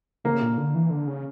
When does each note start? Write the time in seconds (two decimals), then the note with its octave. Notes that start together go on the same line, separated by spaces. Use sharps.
0.24 C#3 A#3
0.41 A#2
0.57 D3
0.75 E3
0.90 D3
1.07 C#3